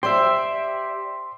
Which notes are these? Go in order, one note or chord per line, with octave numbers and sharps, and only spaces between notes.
G4 C5 D5 E5 C6